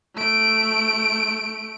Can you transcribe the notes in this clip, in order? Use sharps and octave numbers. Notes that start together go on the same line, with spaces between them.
A3 D7